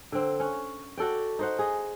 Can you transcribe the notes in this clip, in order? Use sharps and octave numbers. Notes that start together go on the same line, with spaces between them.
D3 C4
C#4 C#5 F#5
F#4 A4 D5 G5
D#4 C5 F#5
G#4 D#5